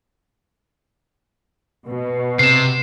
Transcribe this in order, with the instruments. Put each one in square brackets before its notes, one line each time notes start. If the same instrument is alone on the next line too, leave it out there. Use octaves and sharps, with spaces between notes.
[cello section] B2
[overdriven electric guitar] C3 [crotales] C7 E7